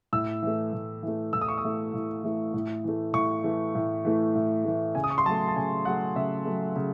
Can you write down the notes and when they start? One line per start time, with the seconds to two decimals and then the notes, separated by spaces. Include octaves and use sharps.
0.13 A2 E6
0.43 E3 A3
0.73 A2
1.03 E3 A3
1.33 A2 E6
1.41 D#6
1.48 C#6
1.57 D#6
1.64 E3 A3
1.94 A2
2.24 E3 A3
2.54 A2
2.84 E3 A3
3.14 A2 C#6
3.44 E3 A3
3.75 A2
4.05 E3 A3
4.35 A2
4.64 E3 A3
4.95 C#3 G#5
5.04 D#6
5.10 C#6
5.18 C6
5.26 F#3 A5
5.30 A3
5.48 A5
5.56 C#3 G#5
5.85 F#3 A3 F#5
6.16 C#3 E5
6.45 F#3 A3
6.76 C#3